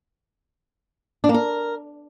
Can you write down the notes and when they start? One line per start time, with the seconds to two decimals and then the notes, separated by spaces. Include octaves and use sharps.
1.24 D4
1.29 A#3
1.34 A#4